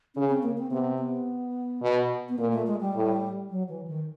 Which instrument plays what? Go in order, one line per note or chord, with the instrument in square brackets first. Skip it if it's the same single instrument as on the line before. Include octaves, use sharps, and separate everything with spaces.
[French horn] C#3 [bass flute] C#4
[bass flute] C4
A#3
C4
[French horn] C3 [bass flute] B3
[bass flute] B3
[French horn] B2
[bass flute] B3
[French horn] A#2 [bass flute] A#3
[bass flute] A3
G#3
G3
[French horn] A2
[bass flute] F#3
E3
D#3